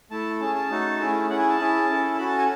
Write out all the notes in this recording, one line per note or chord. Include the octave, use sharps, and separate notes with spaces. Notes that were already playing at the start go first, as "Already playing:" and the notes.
A3 E4 A4 A5
C#4 G#4 A5
A5
A3 D#4 F#4 A4
A3 C#4 E4 G#4
C#4 E4 G#4 F#5
G#5
A5
C#4 E4 G#4
C#4 E4 A4
C#4 F#4 A4 B5
A5
G#5